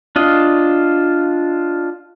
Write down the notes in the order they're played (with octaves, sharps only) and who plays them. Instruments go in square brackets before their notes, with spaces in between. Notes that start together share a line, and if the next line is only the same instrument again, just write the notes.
[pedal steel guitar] D4 F4 D#5